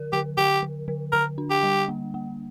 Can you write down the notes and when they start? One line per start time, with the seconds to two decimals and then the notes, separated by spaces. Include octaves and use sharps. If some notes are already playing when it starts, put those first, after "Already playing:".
Already playing: D3 A#4
0.13 D3 G4
0.38 D3 G4
0.63 D3
0.88 D3
1.13 D3 A#4
1.38 D4
1.50 G4
1.63 G3
1.89 A#3
2.14 A#3